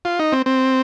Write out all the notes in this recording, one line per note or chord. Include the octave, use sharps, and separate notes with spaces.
F4
D#4
C4
C4